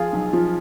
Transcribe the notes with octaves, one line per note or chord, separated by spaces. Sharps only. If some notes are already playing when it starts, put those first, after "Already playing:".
Already playing: F3 F4 G#4
B1
F3